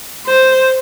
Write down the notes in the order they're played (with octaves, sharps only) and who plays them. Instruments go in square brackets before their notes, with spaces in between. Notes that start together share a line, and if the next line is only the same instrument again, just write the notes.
[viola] C5